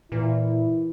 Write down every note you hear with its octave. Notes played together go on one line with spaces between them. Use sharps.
A#2 E3 E4